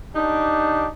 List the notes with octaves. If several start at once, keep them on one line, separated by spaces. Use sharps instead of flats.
D4 D#4 G4